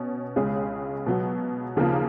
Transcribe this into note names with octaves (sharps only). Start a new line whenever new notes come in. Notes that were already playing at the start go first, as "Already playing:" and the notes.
Already playing: B2 C#4
C#2 C#3 G#3 C#4 G#4
B2 F#3 B3
D#2 C#3 F3 A#3